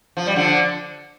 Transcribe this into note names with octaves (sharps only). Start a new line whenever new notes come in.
F3
G3
D3 F3